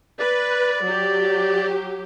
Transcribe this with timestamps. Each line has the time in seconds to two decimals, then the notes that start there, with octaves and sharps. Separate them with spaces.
0.19 B4 D5
0.83 F#3 G4